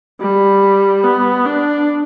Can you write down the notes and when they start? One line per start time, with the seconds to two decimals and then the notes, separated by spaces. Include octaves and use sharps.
0.21 G3
1.04 B3
1.46 D4